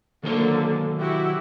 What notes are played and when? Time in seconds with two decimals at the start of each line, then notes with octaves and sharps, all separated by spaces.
0.24 D3 D#3 F#3 A#3 C5
0.99 E4 F#4 G4